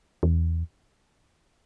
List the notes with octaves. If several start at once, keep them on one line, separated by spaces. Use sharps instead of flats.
E2